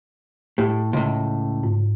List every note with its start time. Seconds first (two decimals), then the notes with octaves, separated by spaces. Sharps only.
0.58 A2 G4
0.93 C#2 A2
1.64 G#2